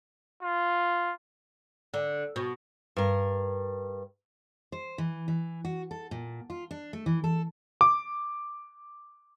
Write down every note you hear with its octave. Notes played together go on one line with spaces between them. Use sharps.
F4
D3
B2
G2 A#4
C5
E3
E3
F#4
A4
A#2
F4
D4
A3
E3
A4
D6